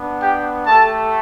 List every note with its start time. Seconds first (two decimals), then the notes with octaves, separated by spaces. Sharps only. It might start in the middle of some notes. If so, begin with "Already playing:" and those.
Already playing: B3 D4
0.21 G4 G5
0.66 A3 G4 A4 A5